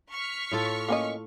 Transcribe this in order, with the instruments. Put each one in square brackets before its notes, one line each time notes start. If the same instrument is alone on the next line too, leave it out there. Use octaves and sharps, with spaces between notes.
[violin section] C#6 F6 B6
[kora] A2 F4 A4
[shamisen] A#3 C#4 D#5